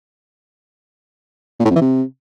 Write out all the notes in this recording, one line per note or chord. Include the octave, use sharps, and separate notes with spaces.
A#2
A2
F2
E3
C3